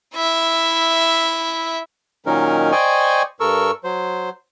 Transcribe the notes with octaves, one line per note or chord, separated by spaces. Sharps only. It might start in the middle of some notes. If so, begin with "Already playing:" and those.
E4 E5
A#2 D#3 F#3 C#4 D#4 A#4
C5 D5 D#5 G5 G#5 C#6
G2 A4 A#4 C#6 E6
F#3 C5